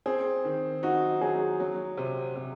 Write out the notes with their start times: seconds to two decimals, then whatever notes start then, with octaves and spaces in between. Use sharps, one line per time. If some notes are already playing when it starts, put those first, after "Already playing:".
0.06 C4 G#4
0.45 D#3
0.83 D#4 F#4
1.21 F#3 G#4
1.60 F#3
1.97 C3
2.36 C3